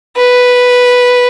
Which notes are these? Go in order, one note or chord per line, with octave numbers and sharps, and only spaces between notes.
B4